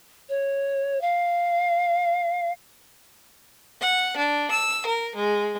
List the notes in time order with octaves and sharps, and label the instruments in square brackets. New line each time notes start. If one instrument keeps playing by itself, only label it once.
[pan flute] C#5
F5
[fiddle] F#5
D4
E6
A#4
G#3